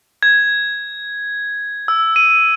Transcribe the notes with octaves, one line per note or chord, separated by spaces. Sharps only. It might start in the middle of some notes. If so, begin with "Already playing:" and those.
G#6
E6
D#7